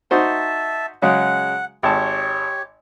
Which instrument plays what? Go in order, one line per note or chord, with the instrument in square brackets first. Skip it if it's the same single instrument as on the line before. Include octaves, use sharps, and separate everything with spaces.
[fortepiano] D#4 F#4 C5 [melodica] E5 A5
[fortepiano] C#3 F#3 G#3 [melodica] F#5
[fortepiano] G#1 A5 [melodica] G4 C#5